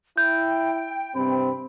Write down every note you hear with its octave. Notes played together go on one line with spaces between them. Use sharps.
E4 G5 G6
G2 C3 C4 B5